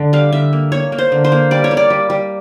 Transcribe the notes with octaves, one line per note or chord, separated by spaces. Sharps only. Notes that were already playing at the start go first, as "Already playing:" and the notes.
Already playing: D3
G3 F5
D3 E5
A#3
A#3 C#5
A#3
C5
D3
C5
A#3
G3 D5
C#5
A#3
D5
G3
G3